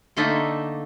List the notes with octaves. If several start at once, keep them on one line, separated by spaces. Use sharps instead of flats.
D3 A3 A#3 D#4 A4 E5